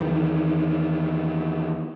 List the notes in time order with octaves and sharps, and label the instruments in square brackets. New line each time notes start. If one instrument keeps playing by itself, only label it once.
[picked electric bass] E2 D#3